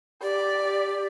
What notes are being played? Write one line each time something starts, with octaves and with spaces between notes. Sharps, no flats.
G4 D5